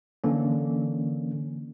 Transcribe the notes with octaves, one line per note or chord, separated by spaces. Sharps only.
D3 E3 A#3 C#4